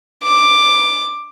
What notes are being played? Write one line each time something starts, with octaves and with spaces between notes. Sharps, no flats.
D6